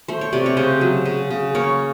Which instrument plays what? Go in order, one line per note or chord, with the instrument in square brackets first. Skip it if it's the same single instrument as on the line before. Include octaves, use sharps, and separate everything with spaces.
[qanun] A3 C5
C#5
C3 D5
C#5
C#3 C5
F#3
C#3
C#3
A#3 C#5